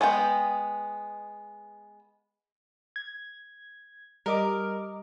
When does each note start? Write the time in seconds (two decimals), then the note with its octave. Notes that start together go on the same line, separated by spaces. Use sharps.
0.01 G#3 B3 B4 G5
2.96 G#6
4.26 G3 A#4 D#5 D6